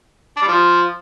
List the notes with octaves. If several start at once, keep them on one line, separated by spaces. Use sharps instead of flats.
D4
G3
F3